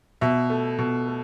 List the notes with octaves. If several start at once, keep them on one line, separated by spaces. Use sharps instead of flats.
B2 E5
A3
B2
A3